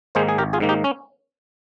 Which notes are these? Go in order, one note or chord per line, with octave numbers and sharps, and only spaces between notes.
G#2 D#3 A#3 G#4 C5
G#4
G#1 G4 A#4
F4 G#4
G#2 D#3 A#3
D#4 G4
C#4